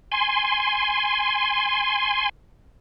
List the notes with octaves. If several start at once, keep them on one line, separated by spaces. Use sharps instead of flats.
G#5 C6